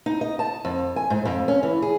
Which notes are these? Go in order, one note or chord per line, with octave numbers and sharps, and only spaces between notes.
D#4
D#5
A5
F2
G#5
G#2
F2
C#4
E3
G#4